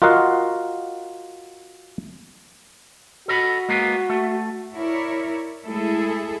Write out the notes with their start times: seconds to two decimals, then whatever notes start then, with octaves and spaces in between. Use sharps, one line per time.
0.02 F4 F#4 A#4 D#5 F5 F#5
3.28 F#4 A4 D#5 B5
3.69 G#3 A#3 B3
4.10 A3
4.73 E4 A#4 C#5 D5
5.65 G#3 A3 E4 G#4 A4